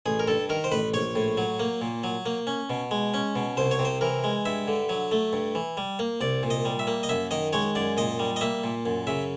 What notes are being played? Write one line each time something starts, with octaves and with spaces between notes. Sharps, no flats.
A1 G#4
A#4
G2 A4
D#3 A#4
C5
A1 B4
A#1 C#5
A2
F#3
A#3
A#2
F#3
A#3
C#4
B2
G#3
C#4
B2
C2 C5
C#5
C3
C5
E3 A#4
G#3
G2 E5
D3
F#3
A3
G2
E3
G3
A#3
C2 D5
A#2
D#5
G3
E5
A#3
D#5
F#2 E5
D#3 D#5
G#3 C#5
F#2 D5
A#2 D#5
G3
D#5
A#3 E5
A#2
F#2
C#3 E5